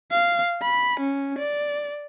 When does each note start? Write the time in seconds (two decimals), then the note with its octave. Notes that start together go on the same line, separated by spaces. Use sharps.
0.11 F5
0.62 B5
1.00 C#4
1.39 D5